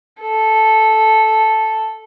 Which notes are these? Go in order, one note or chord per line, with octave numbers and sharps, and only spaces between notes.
A4